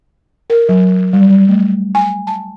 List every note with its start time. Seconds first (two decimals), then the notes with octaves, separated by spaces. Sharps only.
0.50 A#4
0.69 F#3
1.13 G3
1.30 G3
1.49 A3
1.95 G#5
2.27 A5